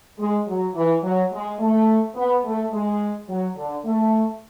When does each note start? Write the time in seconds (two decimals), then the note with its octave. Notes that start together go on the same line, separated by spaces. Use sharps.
0.18 G#3
0.46 F#3
0.74 E3
1.02 F#3
1.31 G#3
1.59 A3
2.15 B3
2.43 A3
2.71 G#3
3.28 F#3
3.55 D3
3.83 A3